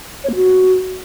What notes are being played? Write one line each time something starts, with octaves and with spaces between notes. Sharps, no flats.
C#5
A#3
F#4